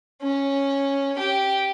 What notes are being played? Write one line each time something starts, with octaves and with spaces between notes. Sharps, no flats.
C#4
G4